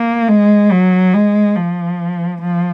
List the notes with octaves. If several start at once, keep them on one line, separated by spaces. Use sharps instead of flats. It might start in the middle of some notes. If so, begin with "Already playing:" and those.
Already playing: A#3
G#3
F#3
G#3
F3
F3